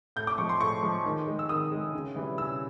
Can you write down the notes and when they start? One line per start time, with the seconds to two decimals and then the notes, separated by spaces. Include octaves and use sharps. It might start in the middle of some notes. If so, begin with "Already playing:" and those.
0.16 A2 G6
0.27 D6
0.38 F3 G#3 C#6
0.49 C6
0.60 A2 C#6
0.83 F3 G#3
1.05 D#3
1.27 G#3
1.39 E6
1.49 D#3 D#6
1.72 G#3
1.94 C#3
2.16 E3 G3
2.38 C#3 E6